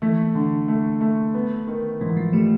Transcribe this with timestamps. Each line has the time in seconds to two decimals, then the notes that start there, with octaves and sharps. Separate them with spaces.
0.02 E3 A3
0.35 D3
0.68 A3
1.01 A3
1.34 B3
1.67 D#3
2.01 G#2 E3
2.17 F3
2.33 G3 A3